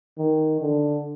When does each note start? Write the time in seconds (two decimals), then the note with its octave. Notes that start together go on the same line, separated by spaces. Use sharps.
0.18 D#3
0.61 D3